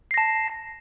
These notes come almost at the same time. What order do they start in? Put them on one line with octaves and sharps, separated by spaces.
C7 A#6 A5